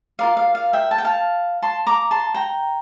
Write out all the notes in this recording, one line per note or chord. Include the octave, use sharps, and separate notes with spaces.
F4 A#4 D5 F5
F5
F5
E5 G5
A5
G5
F5 A5
A5 C6
A#5 D6
A5 C6
G5 A#5